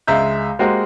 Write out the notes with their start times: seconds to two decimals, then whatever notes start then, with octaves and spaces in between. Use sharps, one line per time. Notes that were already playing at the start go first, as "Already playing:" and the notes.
0.07 C#2 G#3 E5 A#5 G6
0.59 G#3 A#3 F#4 G4 A#4 C5